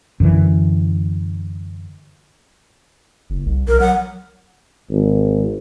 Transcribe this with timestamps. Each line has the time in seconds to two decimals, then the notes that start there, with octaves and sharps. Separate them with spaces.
0.20 F#2 D3 E3
3.30 F#1
3.46 C2
3.68 B1 A#4
3.80 F#3 F#5
4.90 G#1